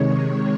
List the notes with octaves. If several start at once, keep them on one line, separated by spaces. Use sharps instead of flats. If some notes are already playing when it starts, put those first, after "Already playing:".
Already playing: C3 D#3 G#3 C#5